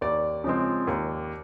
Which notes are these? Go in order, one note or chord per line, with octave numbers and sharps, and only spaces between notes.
D#2 D5
C#3 F3 G#3 C4
D#2